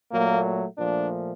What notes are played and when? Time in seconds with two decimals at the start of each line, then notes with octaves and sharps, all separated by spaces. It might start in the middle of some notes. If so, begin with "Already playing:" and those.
0.10 A#2 F#3 A3 A#3
0.78 A#2 F3 A3 D4